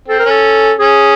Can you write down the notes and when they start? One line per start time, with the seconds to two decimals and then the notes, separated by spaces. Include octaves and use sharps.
0.08 C4 A4
0.20 A#4
0.25 C#4 A4
0.79 C#4 G#4